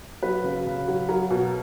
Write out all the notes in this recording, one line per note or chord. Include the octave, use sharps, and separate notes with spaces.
F#3 B4
C#3
C#3
F#3
F#3 A#4
B2